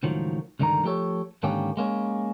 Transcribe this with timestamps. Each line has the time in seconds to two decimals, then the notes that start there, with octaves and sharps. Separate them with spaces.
0.03 C#2 A2 D#3 F3 F#3
0.59 C#2 G2 D3 D#3 A#4 A#5
0.84 F3 A3 G4 A4 C#5
1.43 G#2 D3 D#3 A#3 C#4 G4
1.77 G#3 A#3 C#4